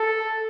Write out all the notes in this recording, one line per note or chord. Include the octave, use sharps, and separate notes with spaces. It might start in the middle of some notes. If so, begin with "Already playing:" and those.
Already playing: A4